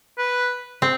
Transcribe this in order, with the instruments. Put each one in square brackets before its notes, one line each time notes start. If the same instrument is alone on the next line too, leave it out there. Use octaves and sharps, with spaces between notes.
[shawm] B4
[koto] C4